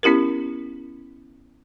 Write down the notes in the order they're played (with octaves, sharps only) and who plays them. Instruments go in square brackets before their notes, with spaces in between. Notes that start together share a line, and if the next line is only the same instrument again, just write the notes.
[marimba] B3 C#4 E4 G4 A#4